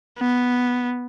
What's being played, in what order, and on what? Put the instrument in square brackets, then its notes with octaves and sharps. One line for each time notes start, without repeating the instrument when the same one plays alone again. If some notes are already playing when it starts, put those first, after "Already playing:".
[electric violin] B3